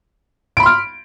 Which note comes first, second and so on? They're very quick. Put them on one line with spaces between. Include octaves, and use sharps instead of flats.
D7 B5 C6 F6